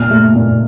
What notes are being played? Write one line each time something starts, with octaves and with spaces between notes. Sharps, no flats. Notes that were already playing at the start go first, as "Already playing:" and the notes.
Already playing: A#2 F6
A3
A#2